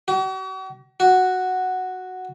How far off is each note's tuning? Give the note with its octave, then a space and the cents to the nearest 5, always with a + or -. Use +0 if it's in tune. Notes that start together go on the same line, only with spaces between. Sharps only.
F#4 +45
F#4 +0